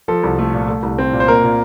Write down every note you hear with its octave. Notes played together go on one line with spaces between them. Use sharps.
F3 A4
C2
A3
A#2
A3
C2
C4
A#2
C5
A#3 A#4
A#2